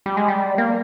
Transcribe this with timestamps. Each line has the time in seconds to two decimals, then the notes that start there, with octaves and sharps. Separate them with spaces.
0.06 G3
0.17 G#3
0.28 G3
0.58 A#3